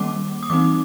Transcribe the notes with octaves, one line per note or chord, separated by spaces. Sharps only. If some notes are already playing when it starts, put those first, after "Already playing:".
Already playing: D#3 G3 A#3 C#4 D6
D#6
E3 G3 C4 D#4 D6